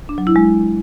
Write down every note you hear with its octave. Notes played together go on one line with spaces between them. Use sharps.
D4
F#3
E4
G#3